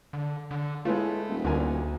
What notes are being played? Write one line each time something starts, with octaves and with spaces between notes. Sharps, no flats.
D3
D3
A2 G#3 A3 B3 F4
D#1
D2 D3 A#4 G#5